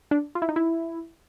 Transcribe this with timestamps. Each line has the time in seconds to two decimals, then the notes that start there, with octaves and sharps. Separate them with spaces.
0.11 D4
0.35 F4
0.42 E4
0.49 D#4
0.56 E4